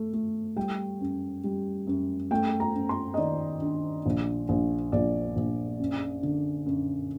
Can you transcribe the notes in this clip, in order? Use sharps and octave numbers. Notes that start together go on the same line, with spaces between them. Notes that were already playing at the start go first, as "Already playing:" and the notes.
Already playing: A3
A3
G3 G5
F#2
G3
F#2
A3 G5
A#5
F#2
C6
D#5
D#3 D5
D4
A#1
A#1
A#1 D5
A#1
F#2
D3
F#2